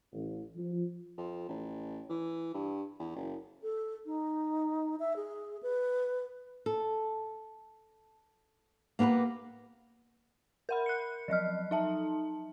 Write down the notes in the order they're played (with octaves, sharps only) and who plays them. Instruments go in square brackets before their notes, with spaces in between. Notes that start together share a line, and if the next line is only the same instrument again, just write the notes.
[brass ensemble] A1
F3
[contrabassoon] F2
A1
E3
G2
E2
F#1
[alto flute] A4
D#4
E5
G#4
B4
[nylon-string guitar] A4
A#3 B3 G4 A#4 B4
[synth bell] A#4 F#5 B5
F#6 C#7
F3 F#3 D#5 F6
D#4 E5 A5